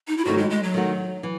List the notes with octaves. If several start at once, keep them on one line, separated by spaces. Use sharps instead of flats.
D#4
E4
G#2 D#3 F#3 A3 D#4 F#4
G#3
G#3
F#3
D#3 A3 D#4 F#4
E3